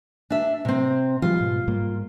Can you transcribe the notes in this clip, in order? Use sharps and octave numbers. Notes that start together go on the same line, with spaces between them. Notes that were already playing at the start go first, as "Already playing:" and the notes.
D4 E5
C3 C4
F3 G3 G#3 F4
G#2 B2
G#2 G3 A#3